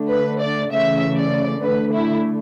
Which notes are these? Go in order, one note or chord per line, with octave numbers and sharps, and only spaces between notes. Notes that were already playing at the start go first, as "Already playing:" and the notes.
Already playing: D3 A3
B4
D5
C#3 E3 A3 E5
D5
D3 A3 B4
E4